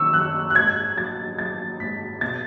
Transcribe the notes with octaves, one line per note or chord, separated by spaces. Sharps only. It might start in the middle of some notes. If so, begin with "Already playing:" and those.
Already playing: F#2 D#3 C#6 E6
F#2 F#6
F#6
G#2 G#6
F#3 A6
F#3 A6
G#2 B6
B2 A6